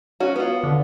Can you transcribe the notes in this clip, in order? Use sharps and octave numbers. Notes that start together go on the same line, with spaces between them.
C#4 F#4
B3 F4
D3